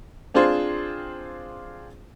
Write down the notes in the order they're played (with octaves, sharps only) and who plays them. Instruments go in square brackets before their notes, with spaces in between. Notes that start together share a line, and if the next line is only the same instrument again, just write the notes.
[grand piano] C4 D4 F4 G#4 C5